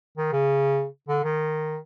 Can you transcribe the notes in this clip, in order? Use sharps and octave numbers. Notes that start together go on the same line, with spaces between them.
D#3
C#3
D3
D#3